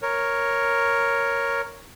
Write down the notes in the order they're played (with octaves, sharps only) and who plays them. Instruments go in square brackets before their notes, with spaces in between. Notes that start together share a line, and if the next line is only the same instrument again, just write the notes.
[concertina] A#4 C#5